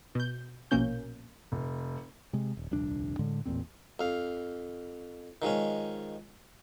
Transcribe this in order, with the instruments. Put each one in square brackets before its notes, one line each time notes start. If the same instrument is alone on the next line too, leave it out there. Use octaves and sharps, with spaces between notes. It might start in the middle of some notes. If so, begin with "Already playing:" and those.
[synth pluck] B2 G6
A#1 B2 A#3 C#4 G6
[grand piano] F1
[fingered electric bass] C3 G#3
D#1
D#1 C2 F2 D4
A2 D3 G#3
A1 E2 A#2 C4
[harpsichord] F2 F5
D#3 F3 G#3 C#4